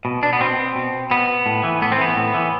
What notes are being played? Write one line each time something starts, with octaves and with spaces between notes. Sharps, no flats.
B2
D4
B3
B2 C4
B2
B2 B3
A2
E3
A2 B3
C4
E3 B3
A2
E3